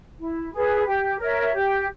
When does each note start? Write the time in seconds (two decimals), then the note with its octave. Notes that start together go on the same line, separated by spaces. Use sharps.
0.19 E4
0.52 G#4 B4
0.85 G4
1.18 A#4 C#5 E5
1.52 G4